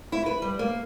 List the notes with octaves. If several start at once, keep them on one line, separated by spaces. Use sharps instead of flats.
E4
B4
G3
A#3